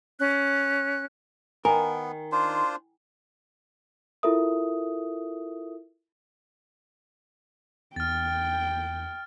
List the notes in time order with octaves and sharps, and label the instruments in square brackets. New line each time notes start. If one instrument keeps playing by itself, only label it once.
[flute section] C#4 F#6
[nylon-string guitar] D#3 [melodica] B3 [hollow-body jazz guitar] A#4 [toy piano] G#5 A#5
[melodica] D4 F4 C5
[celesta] E4 F4 A4 A#4 E5 D#6
[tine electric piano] E2 [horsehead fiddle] G5 [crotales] F6 A6